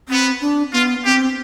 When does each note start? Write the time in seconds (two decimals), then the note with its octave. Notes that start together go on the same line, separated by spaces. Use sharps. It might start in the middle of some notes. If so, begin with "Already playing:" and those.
0.09 B3 C4
0.41 D4
0.72 B3 F4
1.05 C4 G4